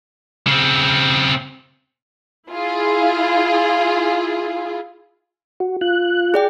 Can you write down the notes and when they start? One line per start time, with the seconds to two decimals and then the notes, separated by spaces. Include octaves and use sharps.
0.47 C#3 C4
2.49 E4 F4 G#4
5.60 F#4
5.81 F4 F#6
6.34 G#4 D5 G5